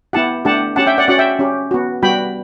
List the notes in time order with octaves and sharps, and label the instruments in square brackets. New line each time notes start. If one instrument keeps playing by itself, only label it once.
[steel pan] B3 E4 G4 F#5 A5
A3 D4 G4 F#5 A5
C#4 G4 F#5 A5
E5 G5
D5 F#5
C#4 F#4 D5 F#5
E5 G5
C#4 G4
B3 F#4
G3 B3 F#4 G5 B5